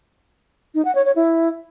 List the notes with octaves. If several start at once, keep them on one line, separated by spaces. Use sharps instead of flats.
D#4
F#5
C#5
C#5
E4